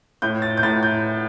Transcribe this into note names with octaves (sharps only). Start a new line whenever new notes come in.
A2 G6
A6
G6
A2 A6
G6